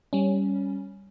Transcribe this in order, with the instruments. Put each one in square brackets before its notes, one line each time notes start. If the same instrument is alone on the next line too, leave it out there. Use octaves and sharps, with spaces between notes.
[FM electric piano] G3 C#4